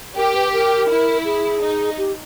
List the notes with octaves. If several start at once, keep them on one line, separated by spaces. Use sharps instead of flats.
G4 A#4
B4
A#4
E4
G#4
D#4
G4